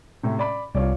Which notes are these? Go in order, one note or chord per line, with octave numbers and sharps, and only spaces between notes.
A2 C3
D5 B5
C2 F4 C#5 D5